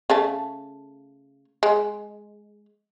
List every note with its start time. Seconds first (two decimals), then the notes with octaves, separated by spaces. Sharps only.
0.10 C#3 A3 A5
1.63 G#3